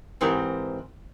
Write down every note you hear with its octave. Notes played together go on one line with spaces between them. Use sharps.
G#2 E3 C4 G4 A#4 A#5